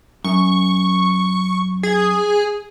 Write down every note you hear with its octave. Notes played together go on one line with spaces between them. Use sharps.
F#2 C#6
G#4